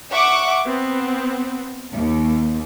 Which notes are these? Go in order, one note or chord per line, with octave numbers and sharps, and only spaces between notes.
E5 F#5 C#6 D6
B3 C4
D#2